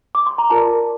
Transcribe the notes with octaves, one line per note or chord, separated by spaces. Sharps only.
D6
C6
A#5
F4 A#4 D5 A5